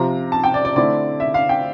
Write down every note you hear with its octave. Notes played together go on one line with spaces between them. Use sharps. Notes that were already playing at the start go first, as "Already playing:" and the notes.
Already playing: C3 F3 C4 F4 A#5
A5
G5
D5
D5
D3 A3 C4 E4 D5
E5
F5
G5